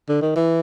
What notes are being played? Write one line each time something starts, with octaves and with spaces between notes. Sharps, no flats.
D3
D#3
E3